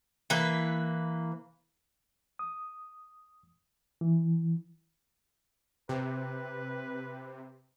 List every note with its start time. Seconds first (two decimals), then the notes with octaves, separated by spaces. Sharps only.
0.30 E3 A#3 B4
2.39 D#6
4.01 E3
5.89 C3 B4